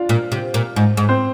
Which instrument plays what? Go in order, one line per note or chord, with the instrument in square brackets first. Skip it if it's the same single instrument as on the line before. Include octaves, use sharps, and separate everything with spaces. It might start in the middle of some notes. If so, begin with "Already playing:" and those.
Already playing: [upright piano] D4 F4 F5
[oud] A#2
C3
A#2
G#2
G#2
[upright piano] C4 C5